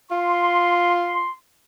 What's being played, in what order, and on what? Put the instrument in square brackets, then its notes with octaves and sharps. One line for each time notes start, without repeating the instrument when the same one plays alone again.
[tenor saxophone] F4 [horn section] C6